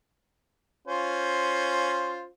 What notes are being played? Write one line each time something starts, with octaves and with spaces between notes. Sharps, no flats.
C#4 F4 C5